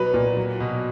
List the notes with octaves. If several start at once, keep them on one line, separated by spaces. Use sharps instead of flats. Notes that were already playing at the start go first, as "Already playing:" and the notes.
Already playing: B2 F#3 B4
A#2
F#3
B2